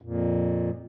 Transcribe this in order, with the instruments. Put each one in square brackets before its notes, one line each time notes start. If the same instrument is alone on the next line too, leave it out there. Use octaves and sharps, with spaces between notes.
[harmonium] F2 A#2